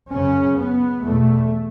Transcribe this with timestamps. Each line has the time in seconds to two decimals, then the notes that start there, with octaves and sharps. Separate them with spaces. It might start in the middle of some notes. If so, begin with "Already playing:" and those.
0.11 F#2 C#3 C#4
0.57 B3
1.03 E2 B2 A3